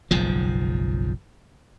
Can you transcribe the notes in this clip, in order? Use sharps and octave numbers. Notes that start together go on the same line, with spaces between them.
F#1 B1 G#2 F3